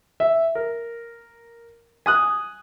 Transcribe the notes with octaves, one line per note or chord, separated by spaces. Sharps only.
E5
A#4
G#5 D#6 F#6